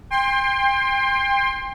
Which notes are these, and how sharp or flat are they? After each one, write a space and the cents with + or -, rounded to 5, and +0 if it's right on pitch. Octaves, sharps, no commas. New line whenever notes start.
G5 +30 C6 +15